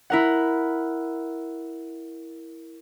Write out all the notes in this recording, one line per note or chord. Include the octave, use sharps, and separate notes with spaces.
E4 A#4 F#5